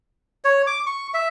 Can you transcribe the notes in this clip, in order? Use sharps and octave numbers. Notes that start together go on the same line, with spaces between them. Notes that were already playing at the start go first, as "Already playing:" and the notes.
C#5
D6
C#6
E5